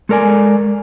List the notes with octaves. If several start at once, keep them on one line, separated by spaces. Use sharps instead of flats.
G#3 A4 A#4 D5 G#5